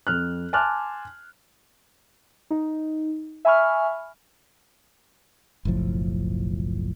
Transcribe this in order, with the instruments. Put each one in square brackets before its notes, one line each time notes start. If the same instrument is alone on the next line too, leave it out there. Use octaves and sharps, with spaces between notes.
[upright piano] F2 F6 F#6
G#5 A5 C6 D6 F6 F#6
[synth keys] D#4
E5 G#5 B5 C#6 F6
[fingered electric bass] F#1 B1 A2 F3